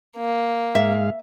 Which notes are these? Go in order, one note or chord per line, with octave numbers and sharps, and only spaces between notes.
A#3
G#2 G#3 E5 F5